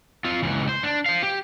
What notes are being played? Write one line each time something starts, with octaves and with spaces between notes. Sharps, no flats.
C4 F4
C#2 E3
C5
D4
C5 F5
G4